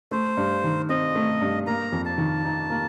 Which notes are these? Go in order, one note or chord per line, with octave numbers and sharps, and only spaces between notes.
A3 C5
G2
D#3
C4 D#5
A3
G2
A#3 A#5
F2
A5
D#3
D#4
A#3